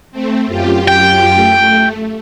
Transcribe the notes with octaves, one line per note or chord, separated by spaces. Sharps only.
A3 C4
F#2 F4 G4
G5
A3